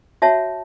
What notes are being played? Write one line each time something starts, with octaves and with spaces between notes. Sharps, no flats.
F#4 C#5 E5 A5